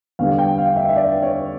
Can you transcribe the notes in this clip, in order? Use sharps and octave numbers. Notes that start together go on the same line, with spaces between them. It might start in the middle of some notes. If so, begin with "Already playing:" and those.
E2 D3 G3 F5
G5
F5
E5
E5
D5
C#5